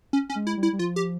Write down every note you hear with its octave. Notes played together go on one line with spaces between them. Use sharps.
C#4
C#4
G#3
E4
G3
E4
G3
F3 F4
G4